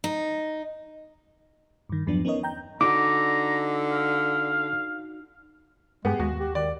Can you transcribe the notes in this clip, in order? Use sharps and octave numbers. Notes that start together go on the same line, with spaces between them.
D#4
G2 D#3
E2 G2 F3 F#3 B3 D4
B3 C#4 D#4 A#4 C#5 D#5
G5 A#5 G6
D3 D#4 F#4 A#5 D6
F5
G2 G#3 B3 G4 G#4
D#2 G#3 F#4
G4
D#3 D5